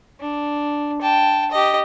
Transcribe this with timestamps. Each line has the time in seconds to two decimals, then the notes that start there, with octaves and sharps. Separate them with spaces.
0.21 D4
1.01 G5 A5
1.51 G4 D#5